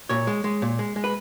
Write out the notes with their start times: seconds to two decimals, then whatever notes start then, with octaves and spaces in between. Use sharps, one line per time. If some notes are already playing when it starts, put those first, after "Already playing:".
0.09 A#2 C#5
0.27 G#3
0.44 G#3
0.62 A#2
0.79 G#3
0.96 G#3
1.04 B4